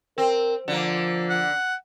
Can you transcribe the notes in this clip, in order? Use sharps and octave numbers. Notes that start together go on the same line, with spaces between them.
C4 A#4
D3 F3 A#3
F#5